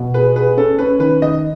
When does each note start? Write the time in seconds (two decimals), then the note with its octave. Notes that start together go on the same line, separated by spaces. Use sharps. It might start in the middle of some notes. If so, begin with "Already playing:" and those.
Already playing: B2
0.14 G#4 B4
0.36 G#4 B4
0.57 C#4 A4
0.79 C#4 B4
0.99 D#3 B4
1.22 D#3 D#5